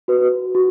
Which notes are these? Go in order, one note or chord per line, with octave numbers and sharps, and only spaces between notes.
F#4 B4
F#4